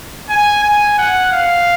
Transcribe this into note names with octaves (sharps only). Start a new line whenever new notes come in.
G#5
G#5
F#5
F5